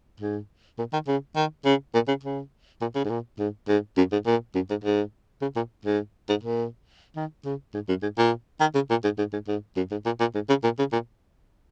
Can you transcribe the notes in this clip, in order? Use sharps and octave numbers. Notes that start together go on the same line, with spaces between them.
G#2
A#2
D#3
C#3
D#3
C#3
A#2
C#3
C#3
A#2
C#3
G#2
A#2
G#2
G#2
F#2
G#2
A#2
F#2
G#2
G#2
C#3
A#2
G#2
G#2
A#2
D#3
C#3
G#2
F#2
G#2
A#2
D#3
C#3
A#2
G#2
G#2
G#2
G#2
F#2
G#2
A#2
A#2
G#2
C#3
A#2
C#3
A#2